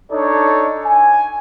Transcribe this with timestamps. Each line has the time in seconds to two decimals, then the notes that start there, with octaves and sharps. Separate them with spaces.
0.12 D4 D#4 A4 C#5
0.85 G#5